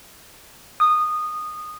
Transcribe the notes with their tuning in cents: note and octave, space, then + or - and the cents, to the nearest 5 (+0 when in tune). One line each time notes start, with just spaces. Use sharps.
D#6 -15